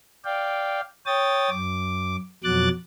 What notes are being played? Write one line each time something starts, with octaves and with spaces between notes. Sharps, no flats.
D5 F5 G5
C#5 G5 D#6 A6
F#2 D6
F2 B2 F#3 D6 F#6 A6